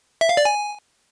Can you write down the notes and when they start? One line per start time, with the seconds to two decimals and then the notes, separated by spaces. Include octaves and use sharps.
0.21 E5
0.29 F5
0.37 D5
0.45 G#5